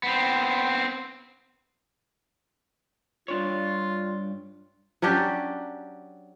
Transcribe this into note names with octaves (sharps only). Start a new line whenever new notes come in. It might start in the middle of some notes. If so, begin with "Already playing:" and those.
B3 C4
G2 D4 F4 C#5
F#3 C#4 D4 G4